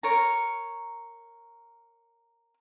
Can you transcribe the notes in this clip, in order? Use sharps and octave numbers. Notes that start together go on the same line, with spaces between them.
A#4 C#5 A#5